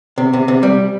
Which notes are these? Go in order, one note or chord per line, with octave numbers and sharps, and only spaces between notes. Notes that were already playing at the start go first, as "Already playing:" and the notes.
C3
C3
C3
G3